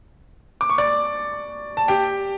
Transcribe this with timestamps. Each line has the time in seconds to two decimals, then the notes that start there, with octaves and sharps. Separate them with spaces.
0.61 D6
0.69 C#6
0.78 D5 D6
1.77 A5
1.88 G4 G5